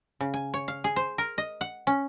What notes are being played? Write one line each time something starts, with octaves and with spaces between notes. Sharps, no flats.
C#3
G#5
C#5
F5
G#4
C5
A#4
D#5
F#5
C#4